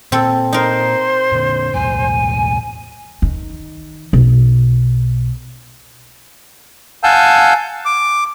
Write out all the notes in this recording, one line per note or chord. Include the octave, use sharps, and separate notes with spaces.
A#2 C4 A4
D#4 A#4 C5
A#2 D3
B1 E2 A2 G#5
D#3
B1
F5 F#5 G#5 A5 E6 G6
D6